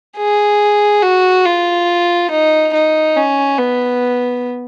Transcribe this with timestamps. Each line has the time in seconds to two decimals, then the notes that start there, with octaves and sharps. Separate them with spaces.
0.18 G#4
1.03 F#4
1.46 F4
2.32 D#4
2.74 D#4
3.17 C#4
3.59 B3